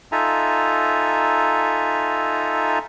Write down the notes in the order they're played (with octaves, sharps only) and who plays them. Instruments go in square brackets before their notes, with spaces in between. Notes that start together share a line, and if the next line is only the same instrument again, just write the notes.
[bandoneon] D#4 F4 A4 E5 G#5 A#5